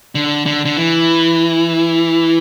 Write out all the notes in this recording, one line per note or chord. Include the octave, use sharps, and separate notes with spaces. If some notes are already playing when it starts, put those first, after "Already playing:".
D3
D3
D3
E3